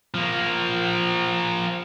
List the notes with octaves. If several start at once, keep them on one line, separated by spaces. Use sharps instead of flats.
F3 A#3